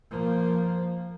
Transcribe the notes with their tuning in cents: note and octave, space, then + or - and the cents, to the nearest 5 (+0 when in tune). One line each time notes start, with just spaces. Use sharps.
F3 -5 A#3 +0